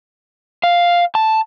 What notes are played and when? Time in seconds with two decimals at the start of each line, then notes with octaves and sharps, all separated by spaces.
0.64 F5
1.15 A5